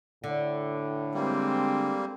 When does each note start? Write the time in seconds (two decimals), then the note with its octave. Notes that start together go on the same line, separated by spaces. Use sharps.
0.24 A2 D3
1.14 G3 G#3 A#3 C4